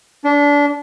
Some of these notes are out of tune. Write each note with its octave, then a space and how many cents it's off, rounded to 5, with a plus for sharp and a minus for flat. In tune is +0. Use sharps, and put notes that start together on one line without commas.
D4 -25